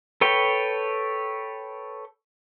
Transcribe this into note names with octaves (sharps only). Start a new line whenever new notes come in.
A4 B4 C#5 G5